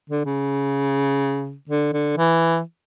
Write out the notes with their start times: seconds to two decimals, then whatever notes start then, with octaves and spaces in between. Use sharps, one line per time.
0.10 D3
0.26 C#3
1.69 D3
1.93 D3
2.17 E3